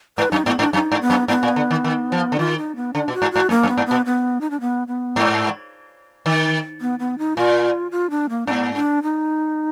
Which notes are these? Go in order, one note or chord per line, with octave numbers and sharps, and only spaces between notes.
G#2 B4
F#2 D#4
G#2 B3
G#2 D4
F#2 D#4
G#2
B3
F#2
G#2 B3
A#2
D3
D#3
D#3
F3
D3
D#3 F4
D#4
B3
D3 D4
B2
F#4
G#2
G#2 F#4
F#2 A#3
F#2
B3
G#2
B3
B2
B3
D#4
D4
B3
B3
G#2
D#3
B3
B3
D#4
A#2 F4
F4
D4
A#3
G#2 B3 D4
D4
D#4